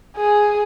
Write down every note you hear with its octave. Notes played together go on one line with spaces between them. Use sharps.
G#4